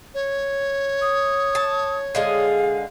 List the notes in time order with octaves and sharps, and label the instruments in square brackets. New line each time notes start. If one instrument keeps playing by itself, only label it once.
[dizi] C#5
[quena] D#6
[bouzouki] A5
[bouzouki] D3 G#3 G#4 [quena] F5